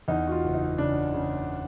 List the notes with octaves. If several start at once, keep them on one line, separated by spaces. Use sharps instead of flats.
E2 D#4
F#4
F4
F#1
D#4
C#3 D4
C#3